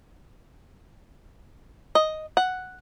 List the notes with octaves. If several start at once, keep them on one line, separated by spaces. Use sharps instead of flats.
D#5
F#5